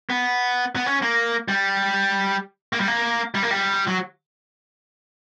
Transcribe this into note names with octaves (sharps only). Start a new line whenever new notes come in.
B3
B3
C#4
A#3
G3
A#3
G3
A#3
G3
A#3
G3
F#3